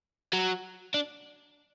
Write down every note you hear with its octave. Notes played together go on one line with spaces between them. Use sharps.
F#3
D4